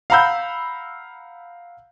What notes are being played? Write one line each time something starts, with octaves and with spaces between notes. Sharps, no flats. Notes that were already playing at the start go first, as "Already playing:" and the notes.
F5 F#5 A#5 B5 E6 G6